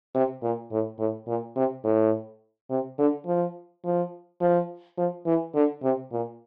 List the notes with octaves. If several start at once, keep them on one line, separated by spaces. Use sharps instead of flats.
C3
A#2
A2
A2
A#2
C3
A2
C3
D3
F3
F3
F3
F3
E3
D3
C3
A#2